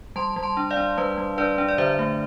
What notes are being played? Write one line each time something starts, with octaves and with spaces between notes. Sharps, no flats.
G3 A5 C6
G3
A5 C6
D4
D5 F5
D4
G3 B4
G3
D4 B4 D5
D4
D5
D3 C5 E5
A3